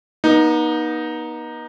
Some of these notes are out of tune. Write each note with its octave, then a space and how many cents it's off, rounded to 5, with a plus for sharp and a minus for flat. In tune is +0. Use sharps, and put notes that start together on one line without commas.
B3 -40 D#4 +0